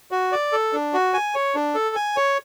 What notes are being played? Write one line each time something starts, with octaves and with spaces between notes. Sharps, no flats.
F#4
D5
A4
D4
F#4
G#5
C#5
D4
A4
G#5
C#5